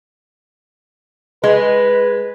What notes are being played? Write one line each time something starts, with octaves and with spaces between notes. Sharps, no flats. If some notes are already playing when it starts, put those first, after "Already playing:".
G#3 B4